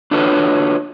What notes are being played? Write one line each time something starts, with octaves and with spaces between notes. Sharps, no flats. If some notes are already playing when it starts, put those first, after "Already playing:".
D4 F4 F#4 A4 B4 C#5